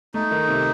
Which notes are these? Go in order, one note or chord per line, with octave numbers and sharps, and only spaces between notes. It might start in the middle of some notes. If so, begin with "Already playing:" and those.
A3 D#4
D#3
C3